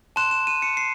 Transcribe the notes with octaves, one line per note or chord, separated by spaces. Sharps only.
A5 C6 F#6 E7
E7
D#7
C#7
C7